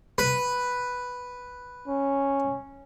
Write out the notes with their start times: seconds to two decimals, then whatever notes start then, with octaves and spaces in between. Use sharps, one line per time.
0.18 B4
1.88 C#4